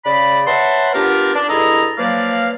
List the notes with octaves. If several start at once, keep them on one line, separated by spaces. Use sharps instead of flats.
C#3 D5 B5
B4 C#5 E5 F#5 A5 C6
B3 D4 F4 G4 A#4
D4
G2 E4 G#4 A4 D#5 A#5
F3 F#3 A#3 B4 D5 F5